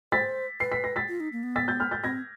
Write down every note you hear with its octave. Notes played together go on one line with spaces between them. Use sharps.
C5 A6 B6
B4 C7
B6
A#6
A6 B6
F4
D#4
A#3
B3
A6 B6
G6 A6
F6 G6
G6 A6
C4 G#6 A#6